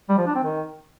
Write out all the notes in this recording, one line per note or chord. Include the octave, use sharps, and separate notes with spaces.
G3
F3
D4
C4
D#3